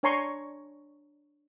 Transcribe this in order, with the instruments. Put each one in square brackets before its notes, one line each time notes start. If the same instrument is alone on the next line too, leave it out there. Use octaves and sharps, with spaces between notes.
[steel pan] D4 C#5 G#5 A#5 C6 C#6